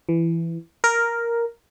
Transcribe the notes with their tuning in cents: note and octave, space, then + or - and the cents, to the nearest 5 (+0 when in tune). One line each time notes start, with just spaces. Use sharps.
E3 +15
A#4 +0